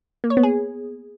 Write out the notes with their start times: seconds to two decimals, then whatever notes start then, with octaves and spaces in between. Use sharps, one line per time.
0.24 A#3
0.30 C#5
0.37 B3
0.43 G#4